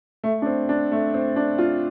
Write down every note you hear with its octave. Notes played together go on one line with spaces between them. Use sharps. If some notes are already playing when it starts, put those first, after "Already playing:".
A3
D4
C4
D4
A3
C4
D4
F4